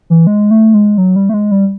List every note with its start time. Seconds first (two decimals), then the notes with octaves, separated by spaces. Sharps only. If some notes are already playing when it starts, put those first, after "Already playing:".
0.10 E3
0.27 G#3
0.51 A3
0.74 G#3
0.98 F#3
1.16 G3
1.29 A3
1.34 G#3
1.51 G3